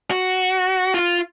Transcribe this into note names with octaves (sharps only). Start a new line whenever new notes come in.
F#4
F4